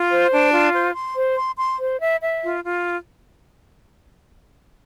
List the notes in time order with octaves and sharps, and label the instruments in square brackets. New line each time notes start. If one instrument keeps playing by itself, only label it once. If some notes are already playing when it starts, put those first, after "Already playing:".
Already playing: [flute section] F4
C5
D4
F4
C5
C6
C5
C6
C6
C5
E5
E5
F4
F4